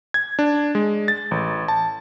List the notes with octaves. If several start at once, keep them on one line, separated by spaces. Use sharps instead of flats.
G#6
D4
G#3
A6
A1
A5